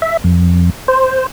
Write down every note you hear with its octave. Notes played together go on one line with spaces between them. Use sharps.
E5
F2
C5